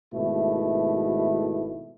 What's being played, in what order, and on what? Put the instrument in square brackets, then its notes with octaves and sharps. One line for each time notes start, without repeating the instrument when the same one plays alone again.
[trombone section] G#1 B2 A3 E4